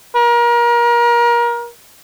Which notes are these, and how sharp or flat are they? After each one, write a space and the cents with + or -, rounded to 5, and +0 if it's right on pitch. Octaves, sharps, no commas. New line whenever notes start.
A#4 +30